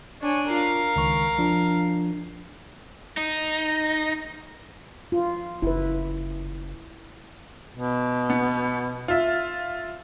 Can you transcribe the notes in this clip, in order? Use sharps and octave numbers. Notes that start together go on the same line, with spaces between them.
D4 C#5 G#5
F4 A#4 F5
C#2 D#3 C#6
F3 D4 F4
D#4
F4
F#1 E4 B4
B2
B3
F4 E5